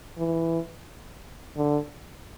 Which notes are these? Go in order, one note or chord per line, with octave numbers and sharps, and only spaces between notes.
E3
D3